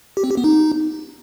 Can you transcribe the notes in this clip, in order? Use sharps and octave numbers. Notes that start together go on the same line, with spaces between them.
G4
C4
G4
B3
D#4